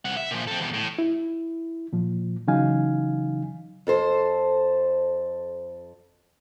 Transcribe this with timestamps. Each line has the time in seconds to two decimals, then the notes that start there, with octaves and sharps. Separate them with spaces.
0.05 C2 F#5
0.17 E5
0.31 A#2 F3
0.47 C4 A4
0.60 E2 B2
0.74 A2
0.98 E4
1.93 A#2 F3
2.48 C#3 E3 F#3 D#4 F5 G#5
3.87 F2 A4 C5